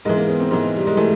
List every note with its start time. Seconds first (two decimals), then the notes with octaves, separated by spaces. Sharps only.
0.05 G#2 E3 G#3
0.17 A#3
0.28 B3
0.40 C4
0.51 G#2 E3 B3
0.76 G3
0.87 G#3
0.97 E3 A3